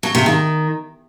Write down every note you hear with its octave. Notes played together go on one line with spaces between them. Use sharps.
F#3
C3
D#3